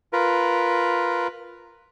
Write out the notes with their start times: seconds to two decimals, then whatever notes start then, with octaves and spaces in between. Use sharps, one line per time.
0.13 F4 A#4 B4